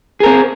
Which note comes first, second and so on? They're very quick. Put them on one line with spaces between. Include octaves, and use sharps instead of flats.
G#4 A#4 C4